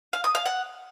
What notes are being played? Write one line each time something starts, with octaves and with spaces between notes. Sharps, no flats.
F5
D#6
F5
F#5